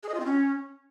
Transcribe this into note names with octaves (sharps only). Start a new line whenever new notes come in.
G#4
D#5
F4
C4
C#4